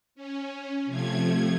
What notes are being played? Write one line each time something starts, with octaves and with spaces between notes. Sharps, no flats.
C#4
C3 F3 A3 G#6